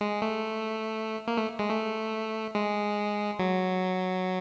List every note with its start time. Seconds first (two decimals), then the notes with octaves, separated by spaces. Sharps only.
0.01 G#3
0.22 A3
1.27 A#3
1.38 A3
1.59 G#3
1.70 A3
2.55 G#3
3.39 F#3